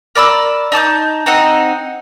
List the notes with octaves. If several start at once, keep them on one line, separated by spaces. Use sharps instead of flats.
A#4 D5 B5 E6
D#4 A5 D#6 G6
C4 D#4 D#5 F#5